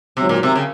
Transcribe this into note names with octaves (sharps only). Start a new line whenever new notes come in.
G#1 G#2 C3 F#3
A#2
C3
C#3